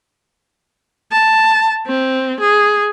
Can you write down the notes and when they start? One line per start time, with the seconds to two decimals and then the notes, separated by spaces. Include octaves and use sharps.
1.12 A5
1.87 C4
2.40 G#4